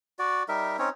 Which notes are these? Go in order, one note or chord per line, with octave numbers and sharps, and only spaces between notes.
F#4 D5
G3 D#4 A#4 E5
C4 C#4 D#4 C#5